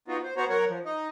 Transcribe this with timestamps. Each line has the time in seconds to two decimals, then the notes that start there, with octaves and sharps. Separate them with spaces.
0.08 B3 D#4 F4 F#4
0.23 C5
0.37 B3 F#4 C5 C#5 A#5
0.50 F#3 A#4 C#5 F#5
0.69 F3
0.85 D#4 D#5